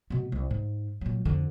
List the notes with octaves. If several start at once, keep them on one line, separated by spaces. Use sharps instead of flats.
B2 B3
C2
G#2
A#2 F#3
F2 D3